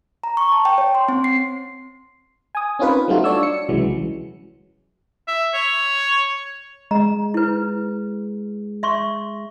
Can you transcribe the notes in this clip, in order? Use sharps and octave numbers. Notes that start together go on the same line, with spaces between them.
A#5
C#6
A5
G5
C#5
C6
C4
C7
G#5 D#6
C4 C#4 D#4 F4 A#4 B4
F#3 G3 A3 D#4 F4 F#4
D4 C#5 D5 E6
C#7
C2 C#3 E3 F#3 G#3
E5
C#5
G#3 A#5
E4 B4
E5 C6 C#6